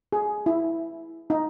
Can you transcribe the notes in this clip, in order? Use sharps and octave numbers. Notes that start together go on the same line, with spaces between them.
G#4
E4
D#4